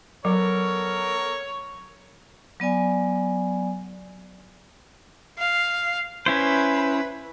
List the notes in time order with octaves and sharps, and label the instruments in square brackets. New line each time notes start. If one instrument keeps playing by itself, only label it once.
[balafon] F#3 [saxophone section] B3 A4 A#4 [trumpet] C#5
[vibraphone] F#3 B3 D5 G#5
[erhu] F5
[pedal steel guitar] C#4 E4 C5 [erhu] B4